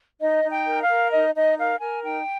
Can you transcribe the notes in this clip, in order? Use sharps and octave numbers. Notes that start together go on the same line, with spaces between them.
D#4 D#5
D#4
G5
A#4
F5
A#4
D#4 D#5
D#4 D#5
A#4 F5
A#4 G#5
D#4 G5